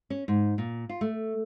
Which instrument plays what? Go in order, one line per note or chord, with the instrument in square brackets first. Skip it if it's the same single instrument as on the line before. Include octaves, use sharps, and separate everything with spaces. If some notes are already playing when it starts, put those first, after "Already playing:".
[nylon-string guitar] C#4
G#2
A#2
F4
A3